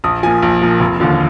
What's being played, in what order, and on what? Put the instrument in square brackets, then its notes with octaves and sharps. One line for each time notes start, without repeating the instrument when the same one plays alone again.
[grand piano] A#1 D#6
A#2 F3 G#5
A#1
A#2 F3
F1
D#2 D3 F3